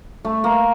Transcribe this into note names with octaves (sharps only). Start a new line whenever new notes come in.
A3
A#3